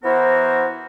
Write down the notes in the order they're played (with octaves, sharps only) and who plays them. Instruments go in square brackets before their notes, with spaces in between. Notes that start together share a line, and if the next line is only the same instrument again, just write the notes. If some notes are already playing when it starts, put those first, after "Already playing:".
[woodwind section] E3 B3 E4 F#4 A#4 C5